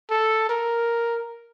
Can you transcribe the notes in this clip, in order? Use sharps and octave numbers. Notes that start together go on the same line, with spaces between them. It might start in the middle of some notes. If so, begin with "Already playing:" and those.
A4
A#4